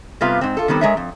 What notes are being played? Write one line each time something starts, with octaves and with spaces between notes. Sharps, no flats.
C3 G3 B3 F4 B4 F5
G#2 C4
F4 A4
D#3 G3 B3 C4
G#3 G#4 A#4 C#5 E5
F2